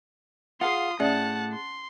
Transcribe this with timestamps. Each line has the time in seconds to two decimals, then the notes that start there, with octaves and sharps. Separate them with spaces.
0.61 F4 G#4 F5 F#5 C6 D#6
1.00 A2 C#4 G#4 D5 E5 F#5 A5
1.53 C6